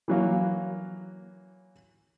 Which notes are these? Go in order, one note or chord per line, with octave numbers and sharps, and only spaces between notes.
E3 F#3 A#3